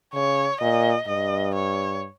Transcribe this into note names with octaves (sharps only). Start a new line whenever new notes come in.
C#3 C#5
A#2 D#5
G2 D#5
C#5